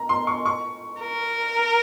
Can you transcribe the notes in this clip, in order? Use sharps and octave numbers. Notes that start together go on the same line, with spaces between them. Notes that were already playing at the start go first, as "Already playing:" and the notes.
Already playing: A#5
C6
C#6
C#6
A#4